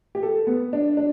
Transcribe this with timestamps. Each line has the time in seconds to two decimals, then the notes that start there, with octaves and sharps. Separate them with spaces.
0.15 G4
0.23 A4
0.47 B3
0.73 D4
0.97 D4